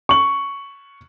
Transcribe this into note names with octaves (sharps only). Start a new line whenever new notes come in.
C#6 F#7